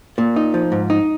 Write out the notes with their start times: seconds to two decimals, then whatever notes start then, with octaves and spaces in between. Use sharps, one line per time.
0.18 A#2
0.36 D#4
0.54 F3
0.72 G#2
0.90 D#4